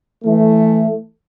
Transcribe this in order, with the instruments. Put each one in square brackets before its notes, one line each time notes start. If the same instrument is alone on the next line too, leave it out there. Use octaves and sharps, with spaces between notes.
[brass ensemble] E3 A3